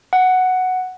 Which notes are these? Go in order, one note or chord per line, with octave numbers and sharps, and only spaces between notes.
F#5